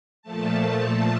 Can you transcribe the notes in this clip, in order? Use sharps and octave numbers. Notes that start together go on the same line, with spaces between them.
A#2 F3 A3 A5